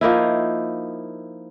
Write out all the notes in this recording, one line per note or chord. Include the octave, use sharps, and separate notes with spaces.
F3 A#3 D#4 E4